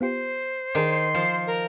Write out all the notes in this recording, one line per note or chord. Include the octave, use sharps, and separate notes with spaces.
B3 F4 G4 C5
D#3 G#4 A#4 D5 C6
F3 C5
A#4